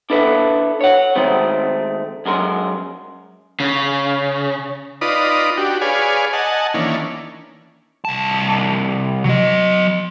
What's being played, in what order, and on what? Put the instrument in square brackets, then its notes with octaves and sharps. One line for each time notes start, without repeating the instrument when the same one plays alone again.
[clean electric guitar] D4 E4 A4 B4 D5 F#5
C#5 F#5
D#3 G#3 A3 C4
F#2 G#3 A#4 C6
[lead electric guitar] C#3
[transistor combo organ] D#4 F4 B4 D5 D#6
D4 F#4 G4
G#4 B4 C#5 D5 F5 G#5
D#5 F#5 G#5 A5
D#3 E3 A#3 C#4 D4
[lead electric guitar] C2 A5
F#3 D#5